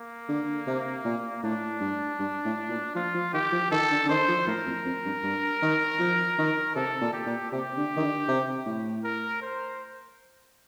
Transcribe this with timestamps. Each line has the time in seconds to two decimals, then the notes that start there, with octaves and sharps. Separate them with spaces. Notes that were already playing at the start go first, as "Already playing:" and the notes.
Already playing: A#3
0.29 D3
0.67 C3
1.05 A#2
1.43 A2 D4
1.80 G2
2.19 G2
2.45 A2
2.69 A#2
2.95 F3 F4
3.14 F3
3.33 D#3 G4
3.52 F3
3.71 D#3 A4
3.90 D3
4.05 D3
4.10 D#3 C5
4.28 F3
4.47 A2 A#4
4.66 F2
4.85 F2
5.05 G2
5.23 G2
5.62 D#3
5.99 F3
6.38 D#3
6.75 C3 A4
7.01 A#2
7.13 G4
7.26 A#2
7.51 C3 G4
7.77 D3
7.96 D#3
8.02 D3
8.28 C3
8.66 A2
9.04 A#4
9.42 C5